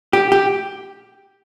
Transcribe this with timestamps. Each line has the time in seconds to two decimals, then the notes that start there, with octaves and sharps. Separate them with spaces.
0.13 G4
0.32 G4